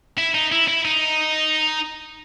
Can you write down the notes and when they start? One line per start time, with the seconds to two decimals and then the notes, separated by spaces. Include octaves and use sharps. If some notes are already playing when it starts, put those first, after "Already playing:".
0.18 E4
0.35 D#4
0.52 E4
0.68 E4
0.85 D#4